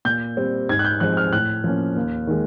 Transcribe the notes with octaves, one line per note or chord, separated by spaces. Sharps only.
A#2 G6
G3 C4
G#2 G#6
F#6
G6
F3 G#3 C4 F#6
F6
A2 F#6
F3 A#3 C#4
D#2
D#3 G#3